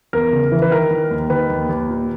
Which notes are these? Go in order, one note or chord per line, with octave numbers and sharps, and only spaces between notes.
E2 A#4
C#3
E3
B4
D#3 A#4
D#3
D#2
D#3 B4
D#2
D#2
A#2